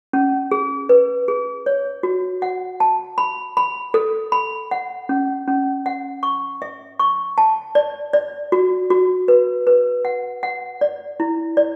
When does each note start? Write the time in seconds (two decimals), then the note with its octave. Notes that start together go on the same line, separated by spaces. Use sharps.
0.13 C#4
0.51 G#4
0.89 B4
1.28 G#4
1.66 C#5
2.03 F#4
2.42 F#5
2.80 A5
3.18 B5
3.57 B5
3.94 A4
4.32 B5
4.71 F#5
5.09 C#4
5.48 C#4
5.86 F#5
6.23 C#6
6.62 E5
6.99 C#6
7.38 A5
7.75 D5
8.13 D5
8.52 F#4
8.90 F#4
9.28 B4
9.67 B4
10.05 F#5
10.43 F#5
10.81 D5
11.20 E4
11.57 D5